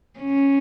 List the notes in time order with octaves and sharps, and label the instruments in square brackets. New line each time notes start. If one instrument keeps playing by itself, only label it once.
[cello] C#4